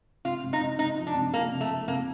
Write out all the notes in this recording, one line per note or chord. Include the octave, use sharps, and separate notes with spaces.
C3 F4
C3
D#4
C3
C3 D#4
F3
D4
C3
F3 A#3
C3
A3
C3
C3 A#3